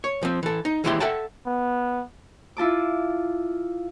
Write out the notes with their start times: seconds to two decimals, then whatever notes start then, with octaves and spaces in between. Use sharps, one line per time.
0.04 C#5
0.23 F3 C4
0.43 E3 A4
0.65 D#4
0.84 D#2 E3 G#3 E4 G4 C6
1.00 A4 E5 F#5 G5 A5
1.46 B3
2.57 E4 F4 A5 D6